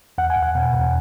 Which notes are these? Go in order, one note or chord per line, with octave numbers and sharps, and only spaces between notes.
E2 F#5
G#5
E2
F#5
B2
E2